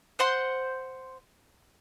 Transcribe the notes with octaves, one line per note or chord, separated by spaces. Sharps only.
C5 F#5 C6